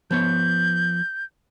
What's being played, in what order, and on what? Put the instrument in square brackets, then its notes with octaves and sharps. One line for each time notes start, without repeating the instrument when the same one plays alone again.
[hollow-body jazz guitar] F3 B3 C#5 [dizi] G6